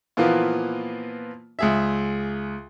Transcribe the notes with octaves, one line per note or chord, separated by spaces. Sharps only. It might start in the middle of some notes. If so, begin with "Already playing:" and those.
A#2 E3 F3 A#3 B3
C#2 G#4 E5